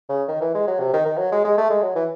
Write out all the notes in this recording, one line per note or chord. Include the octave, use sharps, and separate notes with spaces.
C#3
D#3
E3
G#3
F#3
C3
D#3
D#3
F#3
G#3
G#3
A3
G#3
F#3
E3